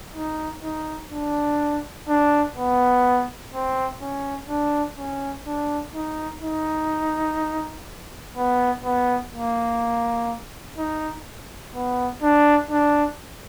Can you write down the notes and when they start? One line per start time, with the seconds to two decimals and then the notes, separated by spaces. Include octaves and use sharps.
0.16 D#4
0.63 D#4
1.11 D4
2.09 D4
2.57 B3
3.54 C4
4.02 C#4
4.49 D4
4.98 C#4
5.46 D4
5.95 D#4
6.42 D#4
8.37 B3
8.84 B3
9.33 A#3
10.78 D#4
11.75 B3
12.22 D4
12.71 D4